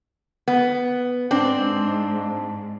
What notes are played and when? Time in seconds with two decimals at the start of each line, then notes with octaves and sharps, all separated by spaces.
0.48 B3
1.31 G#2 C4 D4